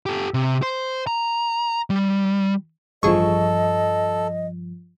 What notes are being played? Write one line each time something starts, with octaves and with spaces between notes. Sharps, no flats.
G4 A4
C3
C5
A#5
G3
A1 G2 F3 G#4 A4 D#5 C#6